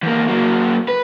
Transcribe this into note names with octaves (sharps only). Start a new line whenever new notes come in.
E2 A#3
F#3 A#3
B4